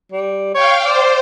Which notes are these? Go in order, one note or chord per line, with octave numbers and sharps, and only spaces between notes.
G3
C#5 F5 G5
C5 D5